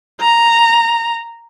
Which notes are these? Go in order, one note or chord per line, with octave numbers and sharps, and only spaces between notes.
A#5